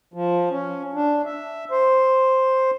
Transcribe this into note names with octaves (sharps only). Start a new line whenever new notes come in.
F3
C#4
D4
E5
C5